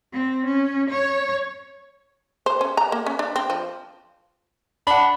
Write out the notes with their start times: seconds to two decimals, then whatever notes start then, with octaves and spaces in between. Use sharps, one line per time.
0.13 C4
0.46 C#4
0.90 C#5
2.46 C5
2.61 C#4
2.77 A#5
2.92 A#3
3.06 C#4
3.19 D4
3.36 C4
3.50 F3
4.87 D4 F#5 B5